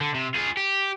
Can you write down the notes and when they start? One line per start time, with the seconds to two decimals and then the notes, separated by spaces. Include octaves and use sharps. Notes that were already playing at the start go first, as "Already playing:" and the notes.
0.01 D3
0.14 C3
0.35 F4 G#4
0.57 G4